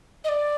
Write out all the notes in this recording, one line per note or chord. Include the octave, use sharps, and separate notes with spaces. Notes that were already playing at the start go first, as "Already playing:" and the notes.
D#5
D5